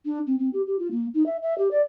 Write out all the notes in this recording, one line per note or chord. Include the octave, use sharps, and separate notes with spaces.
D4
C4
C4
G4
G4
F4
A#3
D#4
E5
E5
G4
D5